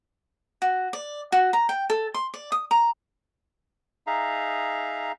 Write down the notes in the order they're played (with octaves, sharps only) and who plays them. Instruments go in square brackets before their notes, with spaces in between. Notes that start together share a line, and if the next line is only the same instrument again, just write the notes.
[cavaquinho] F#4
D5
F#4
A#5
G5
A4
C6
D5
D#6
A#5
[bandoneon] D#4 G#4 E5 F5 A#5